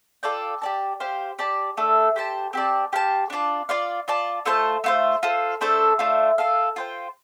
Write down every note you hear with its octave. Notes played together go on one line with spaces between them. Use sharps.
F4 A4 D5 G5
G4 D5 A5
G4 C5 F5
G4 D5 A5
A3 D4 A4
G4 C5 A5
C4 G4 D5 A5
G4 C5 F5 A5
D4 F4 D5 A5
F4 D5 F5
F4 D5 A5
A3 F4 C5 A5
A3 F4 C5
F4 A4 C5
A3 D4 A4 C5
A3 D4 F4 C5
F4 A4 F5
F4 C5 G5